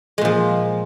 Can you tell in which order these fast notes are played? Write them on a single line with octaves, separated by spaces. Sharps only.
G#3 A#2 F3